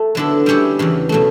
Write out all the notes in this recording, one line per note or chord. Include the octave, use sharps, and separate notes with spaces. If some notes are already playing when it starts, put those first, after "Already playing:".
Already playing: A3
D3 F#3 B3 E4 A4
G3 C#4 E4 G4 C#5
E2 C#3 E3
B2 F#3 A3